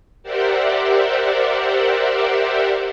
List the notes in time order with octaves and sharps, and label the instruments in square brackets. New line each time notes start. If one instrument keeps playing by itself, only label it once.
[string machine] G4 A#4 C5 D5 E5 F#5